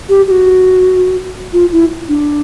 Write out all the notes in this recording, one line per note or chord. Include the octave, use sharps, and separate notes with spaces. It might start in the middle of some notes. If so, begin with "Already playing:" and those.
G4
G4
F#4
F4
E4
D4